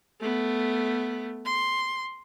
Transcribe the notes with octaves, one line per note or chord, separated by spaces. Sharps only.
A3 B3
C6